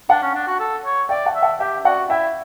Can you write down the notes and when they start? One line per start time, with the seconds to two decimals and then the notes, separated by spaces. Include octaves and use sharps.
0.09 D4 F#5 A5
0.22 C#4
0.34 D4
0.47 F#4
0.59 A4
0.85 C#5
1.09 D5 E5 G5
1.26 F#5 A5
1.35 E5
1.43 F#5 A5
1.59 G4 E5 G5
1.84 F#4 D5 F#5
2.10 E4 E5 G5